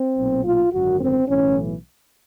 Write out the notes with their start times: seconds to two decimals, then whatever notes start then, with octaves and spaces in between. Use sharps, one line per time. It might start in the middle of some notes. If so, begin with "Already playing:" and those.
Already playing: C4
0.16 B1 A#2
0.44 F4
0.72 G#1 F#2 D3 F#4
1.00 C4
1.28 B1 A2 E3 C#4